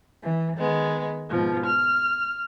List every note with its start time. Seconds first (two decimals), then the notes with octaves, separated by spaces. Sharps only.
0.23 E3
0.58 D#3 G#3 B3
1.30 G#2 B2 F3
1.65 F6